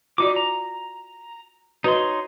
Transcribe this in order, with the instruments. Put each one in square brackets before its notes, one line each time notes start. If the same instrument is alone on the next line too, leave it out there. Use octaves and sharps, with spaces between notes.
[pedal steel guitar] D#4 D6 [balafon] F4 F#4 D5
[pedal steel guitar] A#5
[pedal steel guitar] D#4 C#5 C6 [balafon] F#4 B4 D#5